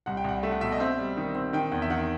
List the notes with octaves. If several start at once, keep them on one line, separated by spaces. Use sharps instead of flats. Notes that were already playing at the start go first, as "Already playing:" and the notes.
C2 F#5
G5
C2 F#5
A3 E5
F#5
B2 E5
D#5
C4 E5
G3
D#3
C4
D#3 G5
E2
E5
D#3 F#5